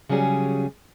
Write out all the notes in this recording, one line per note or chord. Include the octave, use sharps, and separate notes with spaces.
C#3 F#3 G3 C#4 G#4